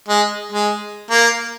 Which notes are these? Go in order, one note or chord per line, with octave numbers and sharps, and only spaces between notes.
G#3
G#3
A#3